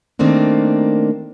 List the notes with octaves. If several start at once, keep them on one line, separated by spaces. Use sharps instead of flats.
D#3 A3 A#3 C4 D4